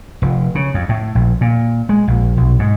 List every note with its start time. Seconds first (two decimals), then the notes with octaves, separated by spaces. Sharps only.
0.22 F1
0.55 C#3
0.74 F2
0.89 A2
1.15 A#1
1.41 A#2
1.89 G#3
2.08 A#1
2.37 B1
2.59 G#2